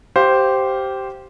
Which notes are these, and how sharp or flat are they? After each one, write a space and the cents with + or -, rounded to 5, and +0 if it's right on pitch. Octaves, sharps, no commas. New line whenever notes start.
G4 -15 C5 +0 F5 +0